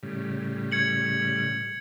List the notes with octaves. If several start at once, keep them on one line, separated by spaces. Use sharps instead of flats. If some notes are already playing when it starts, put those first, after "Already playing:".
A2 C#3 G3
G#6 C#7 F#7